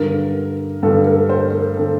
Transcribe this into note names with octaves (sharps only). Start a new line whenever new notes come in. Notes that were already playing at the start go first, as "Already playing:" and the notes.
Already playing: G2 D3 A#4
G2 D3 A4
A#4
C5
A#4
D3 A4